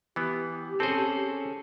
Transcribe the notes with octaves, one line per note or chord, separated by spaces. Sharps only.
E3 B3 G4
C4 C#4 G#4 A4 C5